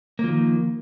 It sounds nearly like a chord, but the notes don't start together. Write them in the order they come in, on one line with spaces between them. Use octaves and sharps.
A#3 F3 D#3